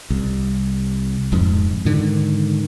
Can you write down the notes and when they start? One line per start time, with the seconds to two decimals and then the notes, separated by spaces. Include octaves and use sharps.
0.10 C2
1.32 D1 F2 G#2
1.85 G#2 D3 D#3